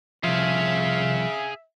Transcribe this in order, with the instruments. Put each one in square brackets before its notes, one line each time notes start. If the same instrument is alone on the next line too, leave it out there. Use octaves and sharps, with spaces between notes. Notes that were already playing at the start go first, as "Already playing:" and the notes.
[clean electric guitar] C2 F3 [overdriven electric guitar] G#4 F5 [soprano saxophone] E5